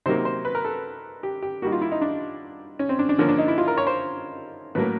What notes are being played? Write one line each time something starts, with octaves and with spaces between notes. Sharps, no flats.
C3 D#3 F#3 A#3 C5
C5
B4
A#4
A4
G4
G4
D#3 G3 A#3 F#4
F4
E4
D#4
D4
C#4
C4
D4
D4
D3 F3 A#3 C#4
D4
D#4
E4
F4
A#4
C#5
C5
A2 F#3 A#3 B4